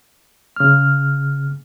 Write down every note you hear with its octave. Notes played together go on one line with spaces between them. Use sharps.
C#3 F6